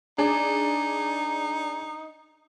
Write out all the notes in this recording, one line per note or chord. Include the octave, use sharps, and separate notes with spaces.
D4 D#4 G#4